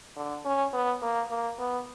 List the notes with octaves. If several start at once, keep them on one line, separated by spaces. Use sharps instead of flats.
D3
C#4
B3
A#3
A#3
B3